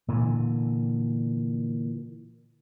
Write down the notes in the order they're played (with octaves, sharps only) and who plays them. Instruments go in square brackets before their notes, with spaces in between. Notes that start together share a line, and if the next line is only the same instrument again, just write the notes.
[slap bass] A#2 D3 E3